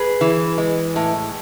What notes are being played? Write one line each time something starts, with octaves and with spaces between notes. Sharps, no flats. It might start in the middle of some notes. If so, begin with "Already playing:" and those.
Already playing: G#4 B4
E3
G#3
A2